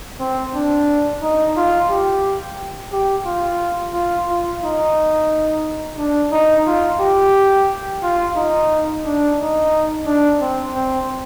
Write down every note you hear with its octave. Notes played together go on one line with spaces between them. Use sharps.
C4
D4
D#4
F4
G4
G4
F4
F4
F4
D#4
D4
D#4
F4
G4
F4
D#4
D4
D#4
D4
C4
C4